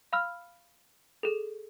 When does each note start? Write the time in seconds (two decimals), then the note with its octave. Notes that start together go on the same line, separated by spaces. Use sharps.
0.13 F5 B5 E6 F6
1.23 G#4 A4